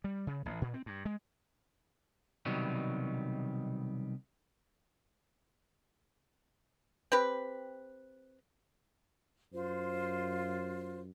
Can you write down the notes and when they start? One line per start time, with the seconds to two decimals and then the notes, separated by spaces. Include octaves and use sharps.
0.04 G3
0.27 C#3
0.46 A1
0.61 A#2
0.74 C4
0.86 G2
1.05 G#3
2.45 C2 B2 D#3 F#3 G3
7.12 C4 G4 B4
9.53 F#2 F4 C5